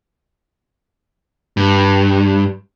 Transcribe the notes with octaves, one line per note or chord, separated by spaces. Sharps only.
G2